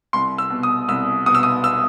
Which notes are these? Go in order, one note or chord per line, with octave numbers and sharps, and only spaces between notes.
C2 C6
E6
B2
D#6
C2 E6
B2 D#6
E6
D#6
E6